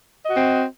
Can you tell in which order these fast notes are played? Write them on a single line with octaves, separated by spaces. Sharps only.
D#5 F#4 C4